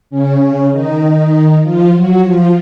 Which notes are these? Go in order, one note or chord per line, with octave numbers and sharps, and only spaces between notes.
C#3 C#4
D#3 D#4
F3 F4
F#3 F#4
F3 F4